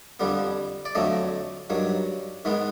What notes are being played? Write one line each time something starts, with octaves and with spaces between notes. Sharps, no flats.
F2 D3 G3 B3
D5
F2 D3 F#3 A3 D#5
G2 D#3 F#3
G#2 D#3 G#3 B3